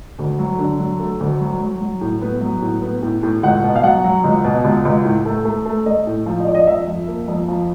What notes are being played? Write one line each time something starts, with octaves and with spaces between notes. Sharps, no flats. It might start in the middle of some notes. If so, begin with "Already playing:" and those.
D2
F#3
D3
F#3
A3
D2
F#3
F#3
F#3
A2
B3
F#3
A2
B3
A2
A2
C#2 F#5
B2
F5
F#3 F#5
F#3
C#2
B2
C#2
C#2
A2
A3
A3
A3
A3 D#5
A2
F3
D#5
F3 D5
D#5
F2 E5
F2
A#3
F2
F3